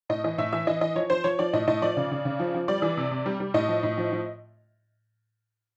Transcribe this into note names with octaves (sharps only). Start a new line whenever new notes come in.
A2 D#5
E3 D#5
A2 E5
E3 E5
E3 D#5
E3 D#5
F3 C#5
F3 C5
F3 C#5
F3 D5
A2 D#5
A2 D#5
F3 D5
C#3
C#3
C#3
F3
F3
G3 D5
E3
C3
C3
G3
G3
A2 D#5
F3
A2
F3
F3